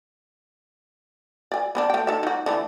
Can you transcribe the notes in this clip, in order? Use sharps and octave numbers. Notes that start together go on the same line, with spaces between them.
D5 G#5
B3 C4 D4
A3 G5
D#4 A4 E5
D#4 F#4
D3 E3 A3